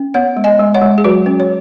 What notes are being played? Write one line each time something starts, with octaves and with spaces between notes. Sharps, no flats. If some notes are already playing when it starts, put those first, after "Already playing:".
Already playing: C#4
B3 C#5 F#5
G#3
D#5 G#5
G#3
C#5 F#5
G#3
G#4
F#3 F#4 B4
C#4
C#5